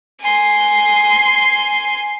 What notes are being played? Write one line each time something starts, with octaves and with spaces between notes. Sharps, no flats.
G#5 C6